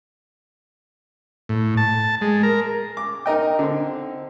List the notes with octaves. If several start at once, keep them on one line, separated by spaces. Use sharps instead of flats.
A2
A5
G#3
A#4
D6
D#4 A#4 D#5 G5
D3 C4